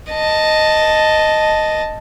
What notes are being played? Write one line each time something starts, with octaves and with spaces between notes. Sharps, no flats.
D#5 A5